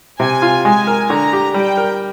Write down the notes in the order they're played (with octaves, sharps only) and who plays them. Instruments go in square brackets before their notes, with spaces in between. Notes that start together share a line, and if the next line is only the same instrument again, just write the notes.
[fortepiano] C3 [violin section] G#5
[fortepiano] F4
[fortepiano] G#3 [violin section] G#5
[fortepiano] A#4
[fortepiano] D3 [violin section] A#5
[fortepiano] G4
[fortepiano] G3 [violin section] G5
[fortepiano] A#4